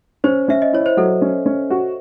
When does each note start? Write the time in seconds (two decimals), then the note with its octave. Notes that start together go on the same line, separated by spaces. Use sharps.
0.24 C#4 C5
0.48 C#4 E5
0.62 D#5
0.73 E4 C#5
0.86 C5
0.97 F#3 A4
1.22 C#4
1.46 C#4
1.70 F#4